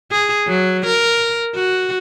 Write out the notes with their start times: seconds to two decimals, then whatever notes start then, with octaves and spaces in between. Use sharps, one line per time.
0.12 G#4
0.47 F#3
0.86 A#4
1.55 F#4